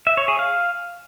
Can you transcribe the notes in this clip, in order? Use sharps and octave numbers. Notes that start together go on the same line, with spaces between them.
E5
C#5
G#4
F5